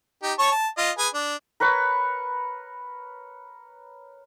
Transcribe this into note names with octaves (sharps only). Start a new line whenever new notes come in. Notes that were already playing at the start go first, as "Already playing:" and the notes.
D#4 G4
C#5 A5 C#6
A5
F4 D#5
G#4 B4 G#5
D4
A#4 B4 C#5 C#6